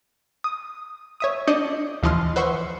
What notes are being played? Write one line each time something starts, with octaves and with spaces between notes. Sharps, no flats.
D#6
C#5 E5 D#6
D4 D5 D#5 D#6 G6 C#7
D#2 E3 F3 D#5 C6 F6
B4 C5 E5 F#5 C6 C#6